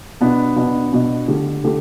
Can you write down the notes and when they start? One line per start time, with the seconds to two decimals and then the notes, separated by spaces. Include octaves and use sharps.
0.21 B2 B3 D4
0.56 B2 B3 D4
0.92 B2 B3 D4
1.28 D3 A3 G4
1.64 D3 A3 G4